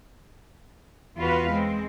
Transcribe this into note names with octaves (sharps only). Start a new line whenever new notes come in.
E2 F4 F#4 B4 F5
G#3 C4